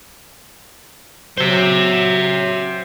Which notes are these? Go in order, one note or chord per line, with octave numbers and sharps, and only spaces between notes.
F#3 C5 E5